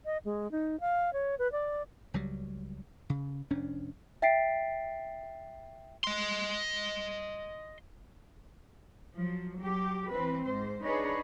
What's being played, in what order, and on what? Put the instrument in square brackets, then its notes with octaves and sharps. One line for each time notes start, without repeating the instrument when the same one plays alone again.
[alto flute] D#5
G#3
D#4
F5
C#5
B4
D5
[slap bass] C#2 F#3 G3
C#3
F1 C#4 D4
[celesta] E5 G5 A6 B6 C7 D7
[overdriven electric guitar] D#5 C6
[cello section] F3 F#3
F#3 G4
E3 C4 B4
G#2 C5
D4 D#4 G#4 B4 C#5